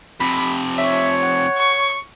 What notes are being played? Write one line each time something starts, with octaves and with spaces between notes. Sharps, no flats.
F2 C3 B5
C#5 E5
F#5
C#6